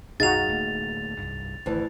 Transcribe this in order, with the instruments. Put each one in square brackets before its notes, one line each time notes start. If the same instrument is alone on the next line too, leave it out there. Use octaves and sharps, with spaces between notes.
[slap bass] B1 F#2 [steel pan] D#4 F#4 [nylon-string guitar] G#4 F5 [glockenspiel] A6 F7
[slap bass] D1 A3 A#3
C2 G2
[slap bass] G#1 [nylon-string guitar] D2 E3 A5